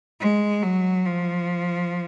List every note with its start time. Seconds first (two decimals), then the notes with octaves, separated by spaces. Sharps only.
0.21 G#3
0.63 F#3
1.06 F3